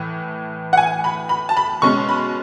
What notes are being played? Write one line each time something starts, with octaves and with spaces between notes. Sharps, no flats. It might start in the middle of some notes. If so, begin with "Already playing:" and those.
Already playing: A2 E3
F#5
G#5
B5
B5
A5
B5
B2 G#3 C#4 C#6
B5